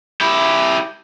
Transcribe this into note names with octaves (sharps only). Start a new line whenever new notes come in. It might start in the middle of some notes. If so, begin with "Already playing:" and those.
E4 G4